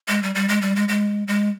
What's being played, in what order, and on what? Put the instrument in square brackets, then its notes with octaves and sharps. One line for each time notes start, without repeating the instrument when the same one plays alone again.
[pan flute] G#3
G3
G3
G#3
G3
G#3
G#3
G#3